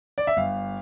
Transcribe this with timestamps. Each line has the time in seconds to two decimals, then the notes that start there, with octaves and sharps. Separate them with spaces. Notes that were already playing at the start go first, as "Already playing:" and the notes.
0.18 D5
0.27 E5
0.37 G1 F5